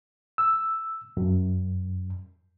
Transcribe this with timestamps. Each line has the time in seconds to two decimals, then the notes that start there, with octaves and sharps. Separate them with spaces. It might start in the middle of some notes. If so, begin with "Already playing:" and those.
0.38 E6
1.17 F#2